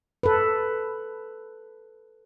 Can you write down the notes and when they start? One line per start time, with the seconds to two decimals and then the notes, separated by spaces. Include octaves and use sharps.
0.23 A4 B4